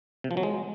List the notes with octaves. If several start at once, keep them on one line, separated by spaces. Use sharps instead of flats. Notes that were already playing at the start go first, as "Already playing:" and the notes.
C3
F3
F#3
G#3